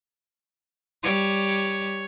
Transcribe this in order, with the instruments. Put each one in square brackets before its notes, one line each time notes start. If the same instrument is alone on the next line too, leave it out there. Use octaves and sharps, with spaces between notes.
[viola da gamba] G3 [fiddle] C#5